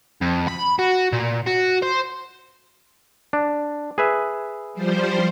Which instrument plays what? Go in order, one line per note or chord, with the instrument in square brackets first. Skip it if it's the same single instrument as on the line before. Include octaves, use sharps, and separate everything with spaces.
[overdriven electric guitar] F2
B5
F#4
A#2
F#4
C5
[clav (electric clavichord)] D4
G#4 B4 E5
[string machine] F3 G3 C5